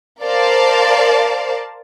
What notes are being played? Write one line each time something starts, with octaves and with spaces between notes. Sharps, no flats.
A#4 C5 D5 F5 A5